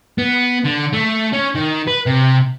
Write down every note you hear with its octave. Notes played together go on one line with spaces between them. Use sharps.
B3
D3
A3
C#4
D#3
B4
C3